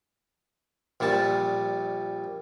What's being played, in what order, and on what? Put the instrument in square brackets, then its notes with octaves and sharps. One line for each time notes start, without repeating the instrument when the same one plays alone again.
[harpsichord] A#1 A#2 G3 A5